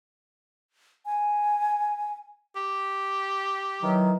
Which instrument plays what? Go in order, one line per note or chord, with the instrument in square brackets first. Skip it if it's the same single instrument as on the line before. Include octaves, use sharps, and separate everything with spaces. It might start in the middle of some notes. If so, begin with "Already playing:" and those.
[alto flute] G#5
[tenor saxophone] G4
[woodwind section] D#3 E3 F#3